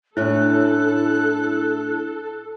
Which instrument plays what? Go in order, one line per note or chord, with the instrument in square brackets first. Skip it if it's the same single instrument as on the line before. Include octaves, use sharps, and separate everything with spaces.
[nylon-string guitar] A2 C#4 [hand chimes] D4 E4 [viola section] A4 [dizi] F#6